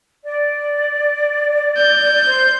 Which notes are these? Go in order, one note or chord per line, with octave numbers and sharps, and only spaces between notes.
D5
G6
C5